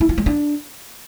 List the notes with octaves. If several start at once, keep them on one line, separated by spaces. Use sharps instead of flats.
E4
F4
G#3
D4